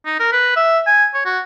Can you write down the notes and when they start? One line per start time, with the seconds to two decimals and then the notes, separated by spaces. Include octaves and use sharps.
0.06 D#4
0.19 A#4
0.32 B4
0.56 E5
0.86 G#5
1.14 C#5
1.26 F#4